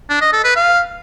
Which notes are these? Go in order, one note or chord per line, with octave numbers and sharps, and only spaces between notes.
D4
D#5
A4
B4
F5